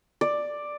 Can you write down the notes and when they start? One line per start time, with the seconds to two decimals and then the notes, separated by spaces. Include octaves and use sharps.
0.21 D5